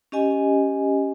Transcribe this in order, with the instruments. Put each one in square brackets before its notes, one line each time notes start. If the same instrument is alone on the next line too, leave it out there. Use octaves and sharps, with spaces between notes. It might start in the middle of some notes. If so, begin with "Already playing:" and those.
[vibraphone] C#4 G4 D#5 G#5